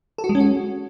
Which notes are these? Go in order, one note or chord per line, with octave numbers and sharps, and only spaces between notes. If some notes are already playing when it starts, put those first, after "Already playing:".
A4
F#4
G#3
C#4
F#4